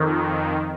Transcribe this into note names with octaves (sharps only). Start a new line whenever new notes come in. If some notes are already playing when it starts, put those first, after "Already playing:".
Already playing: F2 D#3